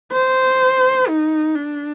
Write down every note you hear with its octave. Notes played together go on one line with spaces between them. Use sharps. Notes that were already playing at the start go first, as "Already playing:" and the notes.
C5
D#4
D4